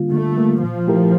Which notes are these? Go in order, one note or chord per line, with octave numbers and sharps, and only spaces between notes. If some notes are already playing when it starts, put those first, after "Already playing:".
Already playing: D3 G3 A#3 F4
D3 A3
G3 A#3 F4
A#2 F3
A3 E4 G4 A#4